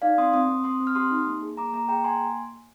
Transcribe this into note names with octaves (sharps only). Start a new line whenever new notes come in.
D#4 D5 F5
C4 C6 D#6
C4 C6 D#6
C4
C4 C6 D#6
C4
F6
G4 C6 D#6
D#4
A#3
G#4
A#3 A#5 D6
A#3 A#5 D6
G#4 G5 A#5
A#3 G#5 C6